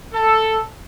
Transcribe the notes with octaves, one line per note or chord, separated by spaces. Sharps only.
A4